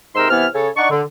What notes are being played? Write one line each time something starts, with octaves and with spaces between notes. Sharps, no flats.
G#2 C3 D#4 A#4 C6 E6
C3 E3 B3 E4 F6
C#3 A4 C#5
D4 D#4 D5 F#5 C#6
D3